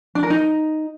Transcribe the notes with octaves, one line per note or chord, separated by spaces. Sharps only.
D4
A#4
D#4